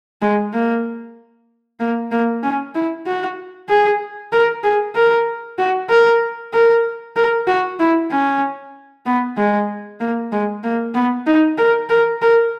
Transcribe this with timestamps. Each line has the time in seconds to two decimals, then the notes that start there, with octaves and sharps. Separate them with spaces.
0.22 G#3
0.53 A#3
1.80 A#3
2.11 A#3
2.43 C#4
2.75 E4
3.06 F#4
3.69 G#4
4.32 A#4
4.63 G#4
4.95 A#4
5.58 F#4
5.90 A#4
6.53 A#4
7.16 A#4
7.47 F#4
7.79 E4
8.11 C#4
9.06 B3
9.37 G#3
10.00 A#3
10.32 G#3
10.63 A#3
10.94 B3
11.26 D#4
11.58 A#4
11.89 A#4
12.22 A#4